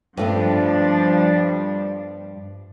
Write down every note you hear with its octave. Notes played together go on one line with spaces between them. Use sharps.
G2 F3 G3 A3 B3 D4